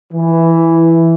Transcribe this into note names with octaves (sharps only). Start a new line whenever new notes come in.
E3